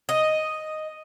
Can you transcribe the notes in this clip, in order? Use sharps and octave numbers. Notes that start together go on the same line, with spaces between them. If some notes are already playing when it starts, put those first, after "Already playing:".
D#5